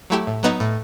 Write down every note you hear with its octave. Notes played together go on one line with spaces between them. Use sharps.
F#3 A3 E4 G4
A2
F#3 B3 D#4
A2